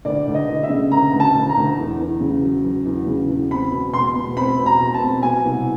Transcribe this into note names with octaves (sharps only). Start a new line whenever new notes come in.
D2 D5
D2
D#5
D2
E5
C#3
D2 A#5
D2
A5
D2
A#5
D2
E2
E2
C#3
F#3
F#3
E2
C#3
E2
C4 B5
B2
B2 C6
B2
C4 B5
B2
A#5
B2
A5
C4
B2 G#5
C2